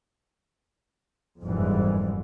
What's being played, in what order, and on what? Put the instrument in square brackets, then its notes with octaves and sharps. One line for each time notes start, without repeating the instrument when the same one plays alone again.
[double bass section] F#1 F2 G#2 E3 G3